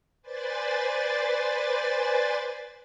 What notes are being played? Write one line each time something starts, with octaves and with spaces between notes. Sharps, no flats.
B4 C5 D5 G#5 A6